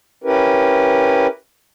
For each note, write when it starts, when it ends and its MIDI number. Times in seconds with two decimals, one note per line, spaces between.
0.24 1.27 61
0.24 1.27 64
0.24 1.27 67
0.24 1.27 70
0.24 1.27 71